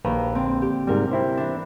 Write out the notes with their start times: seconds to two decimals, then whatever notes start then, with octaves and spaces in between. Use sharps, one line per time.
0.05 A#1 D#2 B4 A#5
0.35 D3 C4
0.62 G4
0.87 G#2 C3 G3 A#4
1.11 C4 E4 C5
1.37 E3 D4